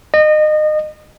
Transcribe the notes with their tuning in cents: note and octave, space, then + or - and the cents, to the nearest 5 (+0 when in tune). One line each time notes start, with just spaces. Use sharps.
D#5 -30